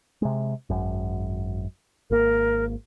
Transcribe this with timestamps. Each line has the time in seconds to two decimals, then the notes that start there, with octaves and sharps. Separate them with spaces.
0.22 C3 G#3
0.70 G#1 F#2
2.10 G#1 A#3 A#4